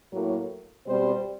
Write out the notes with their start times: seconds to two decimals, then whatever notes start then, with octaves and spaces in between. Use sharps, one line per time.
0.11 A2 F#3 A#3
0.86 B2 G3 C4 C5